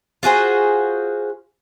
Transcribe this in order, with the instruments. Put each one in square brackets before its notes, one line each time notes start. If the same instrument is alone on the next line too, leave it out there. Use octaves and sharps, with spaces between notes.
[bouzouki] F4 F#4 G#4 C5